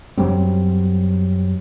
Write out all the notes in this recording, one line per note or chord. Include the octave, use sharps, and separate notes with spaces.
F#2 F#3 G3 C4